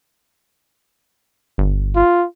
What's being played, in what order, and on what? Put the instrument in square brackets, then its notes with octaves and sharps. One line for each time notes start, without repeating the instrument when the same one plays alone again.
[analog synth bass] G1
[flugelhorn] F4